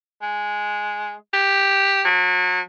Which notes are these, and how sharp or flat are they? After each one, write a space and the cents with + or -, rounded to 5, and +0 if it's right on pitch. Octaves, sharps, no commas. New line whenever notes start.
G#3 +0
G4 +5
F#3 -35